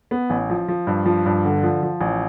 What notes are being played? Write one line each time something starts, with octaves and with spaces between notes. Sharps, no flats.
B3
A1
F3
F3
G2
F3
G2
D3
F3
F3
A1